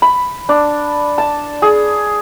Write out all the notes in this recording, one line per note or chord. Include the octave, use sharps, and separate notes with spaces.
B5
D4
A5
G#4